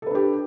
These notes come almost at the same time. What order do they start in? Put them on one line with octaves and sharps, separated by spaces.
A4 B4 D4 G4